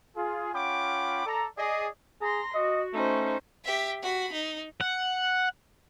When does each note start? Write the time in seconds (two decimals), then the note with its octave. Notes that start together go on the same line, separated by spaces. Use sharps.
0.16 F4 G#4
0.53 C#4 F4 F#5 G5 B5 D6
1.26 A4 D5 A#5
1.58 G#4 D5 D#5
2.21 G#4 A#5 C6 A#6
2.54 F#4 D#5
2.93 A3 C#4 D#4 C5
3.64 G4 E5
4.02 F#4 B5
4.32 D#4
4.81 F#5